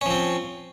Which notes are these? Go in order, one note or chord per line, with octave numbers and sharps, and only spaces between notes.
F3 C4 C#4